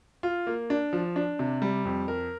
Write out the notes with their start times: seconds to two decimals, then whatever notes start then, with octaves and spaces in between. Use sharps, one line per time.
0.23 F4
0.47 A#3
0.70 D4
0.93 F3
1.16 D4
1.39 C3
1.62 G3
1.85 F2
2.08 A#4